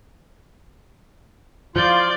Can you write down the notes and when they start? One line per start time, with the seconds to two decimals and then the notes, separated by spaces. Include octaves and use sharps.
1.76 F3 F4 D5 G6